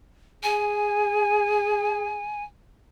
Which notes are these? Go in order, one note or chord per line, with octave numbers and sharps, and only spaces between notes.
G#4 G#5